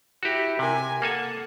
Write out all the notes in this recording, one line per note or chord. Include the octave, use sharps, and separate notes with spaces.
E4 F#4 G4
C3 A#4 G#5
A#3 A4 F#5 G#5